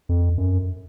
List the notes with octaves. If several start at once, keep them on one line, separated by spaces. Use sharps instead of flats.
F2
F#2